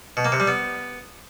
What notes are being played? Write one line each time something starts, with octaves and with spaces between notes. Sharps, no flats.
B2
A#3
C3
G3
B3